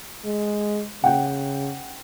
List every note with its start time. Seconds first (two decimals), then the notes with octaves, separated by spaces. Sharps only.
0.25 G#3
1.04 C#3 F#5 G5